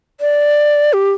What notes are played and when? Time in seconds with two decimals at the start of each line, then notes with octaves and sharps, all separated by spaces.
0.21 D5
0.93 G4